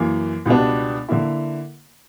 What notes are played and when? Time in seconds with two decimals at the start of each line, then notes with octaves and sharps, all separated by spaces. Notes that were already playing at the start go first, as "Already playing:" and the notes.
Already playing: F#2 E3 A#3
0.45 C#2 B2 G3 B3 D4
1.08 D3 A#3 E4